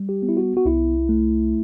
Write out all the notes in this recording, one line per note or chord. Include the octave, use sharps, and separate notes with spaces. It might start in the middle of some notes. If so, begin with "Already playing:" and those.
Already playing: G3
G4
B3
E4
F#4
F#4
C2 E4
A3